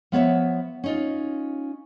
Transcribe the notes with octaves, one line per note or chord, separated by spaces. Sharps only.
F3 B3 C#5 E5
C#4 D#4 F4